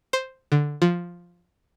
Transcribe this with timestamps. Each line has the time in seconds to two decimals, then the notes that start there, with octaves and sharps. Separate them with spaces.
0.13 C5
0.52 D3
0.82 F3